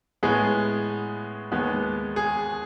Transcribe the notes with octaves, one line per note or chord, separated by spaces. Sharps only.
A2 G#3 B3 G#4
D#2 D#3 G#3 B3
G#4